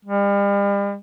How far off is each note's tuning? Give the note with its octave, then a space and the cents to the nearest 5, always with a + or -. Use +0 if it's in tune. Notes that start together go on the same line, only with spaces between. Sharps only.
G3 +40